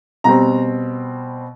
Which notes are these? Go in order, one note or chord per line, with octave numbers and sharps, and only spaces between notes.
B2 G3 C4 A#5